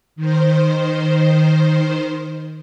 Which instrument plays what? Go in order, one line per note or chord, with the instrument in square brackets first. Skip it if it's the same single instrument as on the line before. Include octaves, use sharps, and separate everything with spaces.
[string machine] D#3 C5